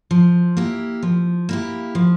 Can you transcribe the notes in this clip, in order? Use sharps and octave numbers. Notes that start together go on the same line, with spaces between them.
F3
A#3 E4 G4
F3
A#3 E4 G4
F3